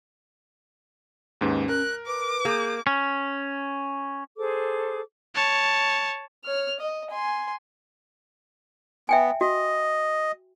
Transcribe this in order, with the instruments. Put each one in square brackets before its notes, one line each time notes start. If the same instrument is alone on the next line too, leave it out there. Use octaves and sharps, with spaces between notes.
[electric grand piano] D#2 G#2 B4 [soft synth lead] C#4
[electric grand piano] A#4 [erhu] F#6
[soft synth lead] B4 [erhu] D6
[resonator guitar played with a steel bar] A#3 [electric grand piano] G#4 [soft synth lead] G6
[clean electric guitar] C#4
[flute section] G#4 A4 C5 D6
[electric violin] C#5 A5
[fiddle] C#5 F6
D#5
G#5 C6
[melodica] B3 [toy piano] E5 G5 G#5
[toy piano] F#4 [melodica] D#5